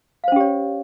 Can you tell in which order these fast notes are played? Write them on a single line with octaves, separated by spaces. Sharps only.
F5 C5 C#4 G4 C#5